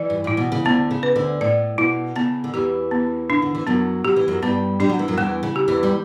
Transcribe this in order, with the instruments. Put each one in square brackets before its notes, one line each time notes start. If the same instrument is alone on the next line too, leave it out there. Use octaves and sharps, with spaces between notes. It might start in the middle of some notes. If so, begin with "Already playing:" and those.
Already playing: [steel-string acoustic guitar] E3 [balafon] D5
[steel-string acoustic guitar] G2
[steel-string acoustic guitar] A2 [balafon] E4
[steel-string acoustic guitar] B2
C#3
[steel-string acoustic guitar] D2 D3 [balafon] B3
[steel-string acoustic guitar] C#3
[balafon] B4
[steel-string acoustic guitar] D2 D3
[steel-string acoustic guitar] A2 [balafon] D5
[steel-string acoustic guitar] B2 [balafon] E4
[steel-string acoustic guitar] C#3 [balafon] B3
[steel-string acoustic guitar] D3
[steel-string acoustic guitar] E2 E3 [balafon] G4
[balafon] B3
[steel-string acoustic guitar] C#3 [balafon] D4
[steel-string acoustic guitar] D3
E3
[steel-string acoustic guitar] F#2 F#3 [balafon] B3
[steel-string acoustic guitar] F#3 [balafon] G4
[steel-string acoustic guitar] E3
F#2 F#3
[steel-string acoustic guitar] G2 G3 [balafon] B3
[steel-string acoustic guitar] G3 [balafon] D4
[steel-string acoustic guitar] F#3
E3
F#2 F#3
[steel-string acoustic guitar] E2 E3 [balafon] G3
[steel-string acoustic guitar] C#3
[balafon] G4
[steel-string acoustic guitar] E2 E3
G3